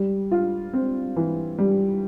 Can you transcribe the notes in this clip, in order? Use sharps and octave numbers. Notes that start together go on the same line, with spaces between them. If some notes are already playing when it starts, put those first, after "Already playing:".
Already playing: G3
F4
C4
E3
G3